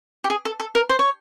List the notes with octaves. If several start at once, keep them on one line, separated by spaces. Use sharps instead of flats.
G4
G#4
A4
A4
A#4
C5
C#5